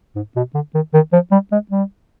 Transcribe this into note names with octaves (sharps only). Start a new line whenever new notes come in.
G#2
B2
D3
D#3
D#3
F3
G3
G#3
G3